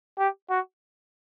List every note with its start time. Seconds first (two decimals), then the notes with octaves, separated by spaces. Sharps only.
0.19 G4
0.50 F#4